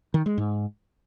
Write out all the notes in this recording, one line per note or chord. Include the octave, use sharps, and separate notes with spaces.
D#3
G#3
G#2